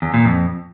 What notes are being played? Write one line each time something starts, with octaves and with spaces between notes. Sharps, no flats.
E2
A#2
F2